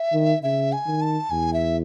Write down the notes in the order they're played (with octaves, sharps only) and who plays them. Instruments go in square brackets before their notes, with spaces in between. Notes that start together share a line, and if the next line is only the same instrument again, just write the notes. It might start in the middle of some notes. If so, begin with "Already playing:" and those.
Already playing: [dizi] E5
[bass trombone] D#3
[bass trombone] C#3 [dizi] E5
[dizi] G#5
[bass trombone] D#3
[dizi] A5
[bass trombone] E2 [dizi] G#5
[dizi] E5